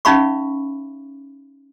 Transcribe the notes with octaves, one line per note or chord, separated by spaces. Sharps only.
C#4 D#4 E5 F5 B5 C#6